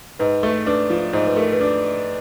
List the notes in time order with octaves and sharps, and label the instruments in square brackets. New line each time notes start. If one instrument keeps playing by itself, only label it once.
[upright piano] G#2 [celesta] B4
[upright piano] A3
[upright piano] D4 [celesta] B4
[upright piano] F3
[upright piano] G#2 [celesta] C5
[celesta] B4
[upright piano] A3 [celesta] A#4
[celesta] B4
[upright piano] D4